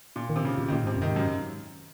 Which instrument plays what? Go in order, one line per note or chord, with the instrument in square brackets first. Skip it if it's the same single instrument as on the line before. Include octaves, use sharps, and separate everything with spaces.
[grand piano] A#2
[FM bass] D#3
[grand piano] C3
C#3
[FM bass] A#2
[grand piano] D#3
[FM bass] A#2 [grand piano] C#3
[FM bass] G#2 [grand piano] C3
[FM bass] F#2
[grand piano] D#3
[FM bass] G#2
[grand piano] F#2